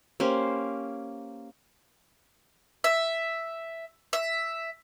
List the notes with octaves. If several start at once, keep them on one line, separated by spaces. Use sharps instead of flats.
A#3 C#4 G4 C5
E5
E5